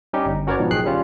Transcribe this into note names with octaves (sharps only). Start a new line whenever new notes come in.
G3 C#4 D#4 G4
G1
C#4 F#4 A#4 B4 C#5 D5
G#2 B2 D#3 F3
B1 D#3 G#4 G5 F#6 C7
G3 C#4 F4